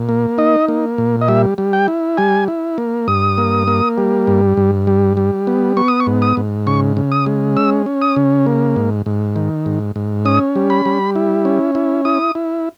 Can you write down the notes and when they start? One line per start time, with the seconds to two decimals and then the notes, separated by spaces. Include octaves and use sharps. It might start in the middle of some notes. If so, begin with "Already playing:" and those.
Already playing: A#2
0.09 A#3
0.38 D#4 D#5
0.68 A#3
0.98 A#2
1.21 D#5
1.28 G3 E5
1.58 G3
1.73 G5
1.88 E4
2.17 G3 G#5
2.48 E4
2.78 A#3
3.08 G2 D#6
3.38 A#3
3.68 A#3
3.98 G3
4.27 G2
4.57 G2
4.87 G3
5.17 G3
5.47 B3
5.77 B3 C#6
5.88 D#6
6.00 C#6
6.07 G#2
6.22 D#6
6.37 G#2
6.67 C#3 C#6
6.97 C#3
7.12 D#6
7.26 G#3
7.56 C#4 E6
7.86 C#4
8.02 D#6
8.16 C#3
8.46 A#3
8.76 G#2
9.06 G#2
9.36 D#3
9.66 G#2
9.96 G#2
10.25 C#4 D#6
10.56 G3
10.70 B5
10.86 G3
11.15 E4
11.45 C#4
11.75 E4
12.05 E4 D#6
12.35 E4